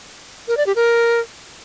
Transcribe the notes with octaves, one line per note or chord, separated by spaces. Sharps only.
A#4
D5
G4
A#4